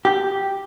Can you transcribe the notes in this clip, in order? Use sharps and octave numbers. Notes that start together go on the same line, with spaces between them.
G4